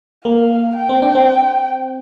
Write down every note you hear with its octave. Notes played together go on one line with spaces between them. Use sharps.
A#3 F5
G5
C4
D4
C4